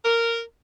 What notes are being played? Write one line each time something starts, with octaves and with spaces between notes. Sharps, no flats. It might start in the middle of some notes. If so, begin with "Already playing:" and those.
A#4